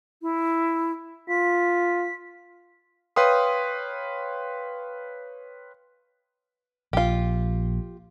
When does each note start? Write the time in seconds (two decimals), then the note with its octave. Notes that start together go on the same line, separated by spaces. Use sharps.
0.22 E4
1.29 F4 B6
3.16 B4 C#5 F5 G5 C6 D#6
6.93 A#1 F4 G4